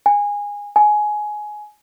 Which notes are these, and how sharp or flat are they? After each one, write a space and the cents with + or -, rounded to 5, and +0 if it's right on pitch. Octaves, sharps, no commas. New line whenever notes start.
G#5 -20
G#5 +15